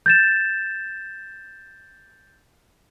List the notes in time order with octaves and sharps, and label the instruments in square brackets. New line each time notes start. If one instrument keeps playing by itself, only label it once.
[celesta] G6 A6 E7